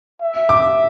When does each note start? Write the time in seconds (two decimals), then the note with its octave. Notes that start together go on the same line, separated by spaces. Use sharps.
0.22 E5
0.49 D6